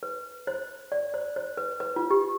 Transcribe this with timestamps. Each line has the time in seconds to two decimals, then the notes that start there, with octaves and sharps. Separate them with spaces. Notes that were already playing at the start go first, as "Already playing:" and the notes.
0.03 B4
0.47 C5
0.92 D5
1.14 C5
1.36 C5
1.57 B4
1.80 B4
1.96 F4
2.11 G4